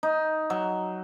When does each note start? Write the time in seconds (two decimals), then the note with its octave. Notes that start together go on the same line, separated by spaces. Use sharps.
0.03 D#4
0.50 F#3